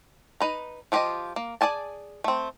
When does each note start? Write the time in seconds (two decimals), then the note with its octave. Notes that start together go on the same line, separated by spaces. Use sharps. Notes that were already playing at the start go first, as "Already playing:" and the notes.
0.40 D#4 B4 A#5
0.92 F3 F4 G4 G#4 D#5
1.36 A#3
1.61 G#4 A4 D5 G#5 A5
2.24 A3 C4